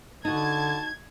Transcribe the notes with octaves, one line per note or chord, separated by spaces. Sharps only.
D3 D#4 F#4 A5 G#6